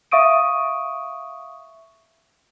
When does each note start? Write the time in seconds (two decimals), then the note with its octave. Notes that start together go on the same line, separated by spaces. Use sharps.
0.11 E5 F5 C#6 D#6 D7 D#7